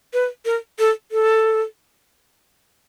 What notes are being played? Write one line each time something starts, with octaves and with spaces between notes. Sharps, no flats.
B4
A#4
A4
A4